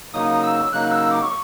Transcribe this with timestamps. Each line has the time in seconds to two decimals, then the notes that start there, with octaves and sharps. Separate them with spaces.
0.14 C#3 F#3 A#3 D#4 D#6
0.43 E6
0.72 C#3 F#3 A#3 D#4 F#6
0.91 E6
1.11 D6
1.22 C#6